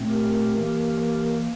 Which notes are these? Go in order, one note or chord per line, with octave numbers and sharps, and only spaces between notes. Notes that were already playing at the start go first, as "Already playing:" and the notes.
Already playing: A#2 A3 C4
G4 A#4
E3 A#3